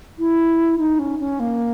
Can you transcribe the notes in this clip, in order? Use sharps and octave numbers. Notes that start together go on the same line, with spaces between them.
E4
D#4
C#4
C#4
A#3